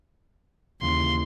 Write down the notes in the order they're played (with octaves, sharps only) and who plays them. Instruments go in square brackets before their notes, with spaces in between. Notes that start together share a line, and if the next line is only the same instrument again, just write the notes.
[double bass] D#2 [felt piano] C#3 E3 [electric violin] C6